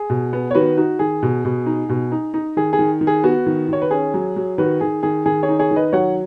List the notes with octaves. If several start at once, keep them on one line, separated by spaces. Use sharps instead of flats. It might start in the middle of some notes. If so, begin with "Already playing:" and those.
Already playing: G#4
B2
B3
C#5
D#3 F#4 B4
D#4 F#4
D#3 G#4
B2
B2
D#4
B2
D#4
D#4
D#3 G#4
G#4
D#3
D#3
G#4
B3 F#4
D#3
D#3 C#5
B4
C#4 G#4
F#3
F#3
D#3 F#4 B4
D#3 G#4
D#3 G#4
D#3 G#4
G#4 C#5
D#4
G#4 C#5
D#3
B4 D#5
F#3 C#5 F#5